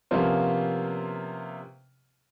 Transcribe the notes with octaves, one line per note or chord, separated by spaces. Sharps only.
C3 F3 A#3 B3 C#4 F4